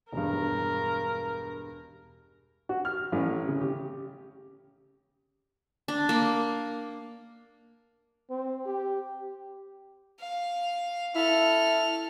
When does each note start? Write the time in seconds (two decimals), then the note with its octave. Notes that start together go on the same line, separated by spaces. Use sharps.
0.13 E1 G2 A#4
2.69 F#4
2.85 F6
3.12 A1
3.48 C#3
3.61 G4
5.88 D4
6.09 A#3
8.30 C4
8.66 G4
10.20 F5
11.15 E4 A4 F6